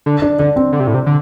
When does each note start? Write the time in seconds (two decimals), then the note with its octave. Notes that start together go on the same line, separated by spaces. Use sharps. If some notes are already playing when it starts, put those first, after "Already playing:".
0.06 D3
0.22 D4
0.39 D3 D4
0.56 C4
0.72 D3
0.80 C3
0.87 A2
0.94 C3
1.06 D3